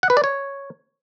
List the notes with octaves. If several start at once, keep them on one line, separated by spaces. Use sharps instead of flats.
F#5
B4
D5
C#5